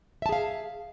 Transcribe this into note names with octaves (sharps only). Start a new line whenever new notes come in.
G#4 E5 F5 A5